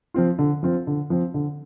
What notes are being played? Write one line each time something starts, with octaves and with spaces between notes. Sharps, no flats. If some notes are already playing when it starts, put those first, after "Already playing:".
F3 C4 F4
D3
F3 C4 F4
D3
F3 C4
D3